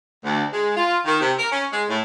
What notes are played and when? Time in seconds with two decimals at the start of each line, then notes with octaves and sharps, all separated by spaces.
0.24 D2
0.53 G#3
0.77 F4
1.05 D#3
1.21 C3
1.39 A#4
1.52 C#4
1.72 G#3
1.89 A2